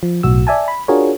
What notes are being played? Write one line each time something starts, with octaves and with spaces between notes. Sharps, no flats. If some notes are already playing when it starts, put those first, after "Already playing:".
F3
B1 A2 F#4 E6
D5 E5 G#5 A5
B5
D4 F4 F#4 G#4 A#4 C#5